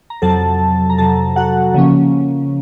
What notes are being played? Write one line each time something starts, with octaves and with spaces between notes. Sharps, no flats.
A#5
F2 C3 F#3 A4 A5
A#5
F2 C3 F#3 A4 A5
F#4 F#5
C#3 F3 A#3 C#4